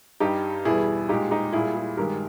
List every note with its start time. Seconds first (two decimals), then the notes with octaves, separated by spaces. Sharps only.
0.20 G2 G3 D#4 G4
0.65 E2 B2 G3 E4 G#4
1.09 A#2 G#3 D#4 G4
1.31 D#4 G4
1.53 A#2 G3 E4 G#4
1.75 E4 G#4
1.97 G2 D#3 G#3 G4 A#4